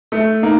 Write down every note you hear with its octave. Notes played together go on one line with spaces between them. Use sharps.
A3
A#3 D#4